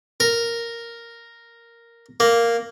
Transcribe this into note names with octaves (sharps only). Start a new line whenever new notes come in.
A#4
A#3